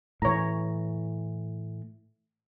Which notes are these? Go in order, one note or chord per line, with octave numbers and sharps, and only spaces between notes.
A2 E3 C#5 A#5